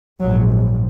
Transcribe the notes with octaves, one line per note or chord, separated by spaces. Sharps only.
A#1 G#2 F#3